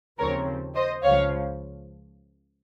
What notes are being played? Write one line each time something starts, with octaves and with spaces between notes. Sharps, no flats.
D#2 C#3 F3 C4 A#4 C#5
C5 D#5
C#2 C#3 F3 C#5 F5